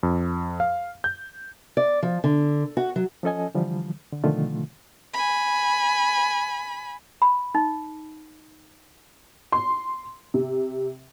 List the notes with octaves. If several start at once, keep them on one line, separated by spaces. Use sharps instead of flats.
F2
F5
G6
D5
F3
D3
F#4
F#3
F3 C#4 A4 D#5 G#5
D3 E3 F3 G3
D3
B2 D3 D#3 F3 A3 F4
G#5 B5
B5
D#4
C6
C3